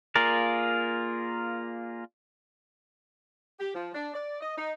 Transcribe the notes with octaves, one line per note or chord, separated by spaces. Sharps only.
A#3 F4 G#4 A#4 D5
G4
F3
D4
D5
D#5
D#4